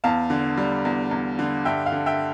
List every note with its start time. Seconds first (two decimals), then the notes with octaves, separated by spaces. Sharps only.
0.04 E2 F5 A5
0.30 D3
0.57 G3
0.85 E2
1.11 E2
1.39 D3
1.65 G2 E5 G5
1.86 F5
1.92 D3
2.06 E5 G5